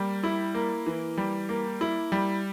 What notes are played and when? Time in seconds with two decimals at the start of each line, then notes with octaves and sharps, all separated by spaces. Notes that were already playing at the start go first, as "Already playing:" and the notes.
Already playing: G3 A#3
0.24 E4
0.54 A#3
0.86 E3
1.17 G3
1.49 A#3
1.81 E4
2.12 G3